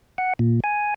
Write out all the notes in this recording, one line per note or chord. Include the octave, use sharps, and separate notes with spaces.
F#5
A#2
G#5